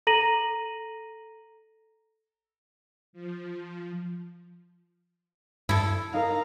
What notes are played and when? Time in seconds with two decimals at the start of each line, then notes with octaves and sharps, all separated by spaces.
0.07 A4 A#5 A#6 D#7 F#7
3.13 F3
5.69 G2 E4 A4
6.14 D#4 A#4 F5 A#5